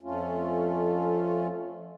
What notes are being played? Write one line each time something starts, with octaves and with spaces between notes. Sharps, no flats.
F2 A3 C#4 F4